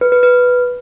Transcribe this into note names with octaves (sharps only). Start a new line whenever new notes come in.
B4
B4
B4